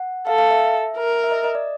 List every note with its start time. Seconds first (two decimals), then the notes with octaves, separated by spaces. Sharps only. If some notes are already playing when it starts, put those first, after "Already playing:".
Already playing: F#5
0.27 A4 F5
0.38 F5
0.51 E5
0.97 A#4
1.24 E5
1.31 D#5
1.44 D#5
1.55 D5